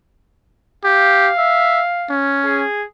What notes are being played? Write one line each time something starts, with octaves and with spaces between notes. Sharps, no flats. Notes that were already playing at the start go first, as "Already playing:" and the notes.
G4 F5
E5
C#4
G#4